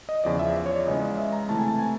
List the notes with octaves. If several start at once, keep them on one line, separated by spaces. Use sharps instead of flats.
D#5
E2 C#3 F3 D5
E5
D5
C#5
D5
C#3 E3 G#3 D#5
E5
A#5
C3 E3 A3 A5
G#5
A5
G#5